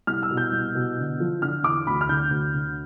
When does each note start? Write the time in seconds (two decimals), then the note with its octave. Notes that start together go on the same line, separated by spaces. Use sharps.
0.07 C2 F6
0.23 E6
0.30 B2
0.37 G6
0.52 C2
0.75 B2
0.98 D3
1.20 F3
1.42 D3 F6
1.63 E2 D6
1.87 D2 B5
2.01 F6
2.09 D3 G6
2.30 D2
2.54 D3